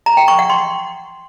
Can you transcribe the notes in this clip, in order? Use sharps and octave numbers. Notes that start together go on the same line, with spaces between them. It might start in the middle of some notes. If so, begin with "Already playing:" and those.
A#5
G5
C#6
F#5
C6